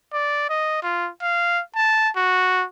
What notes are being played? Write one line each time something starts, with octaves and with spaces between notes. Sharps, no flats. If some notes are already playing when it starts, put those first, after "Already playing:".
D5
D#5
F4
F5
A5
F#4